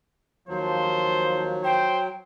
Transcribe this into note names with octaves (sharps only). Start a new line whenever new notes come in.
D#2 F3 F#3 C5
C5 G5